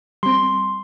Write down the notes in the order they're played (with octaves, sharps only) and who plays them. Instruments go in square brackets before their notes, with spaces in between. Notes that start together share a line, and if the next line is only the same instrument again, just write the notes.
[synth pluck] G3 C4 [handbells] C6